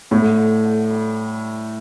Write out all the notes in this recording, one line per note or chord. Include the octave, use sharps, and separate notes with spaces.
A2 D3
D3
D3
G3